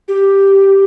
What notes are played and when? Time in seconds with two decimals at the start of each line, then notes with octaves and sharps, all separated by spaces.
0.08 G4